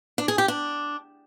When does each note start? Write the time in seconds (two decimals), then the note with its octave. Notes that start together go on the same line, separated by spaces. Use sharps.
0.18 D4
0.28 G#4
0.38 G4
0.48 D4